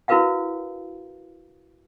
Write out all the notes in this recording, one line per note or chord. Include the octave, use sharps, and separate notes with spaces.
E4 F#4 A#4 B4 F5 F#5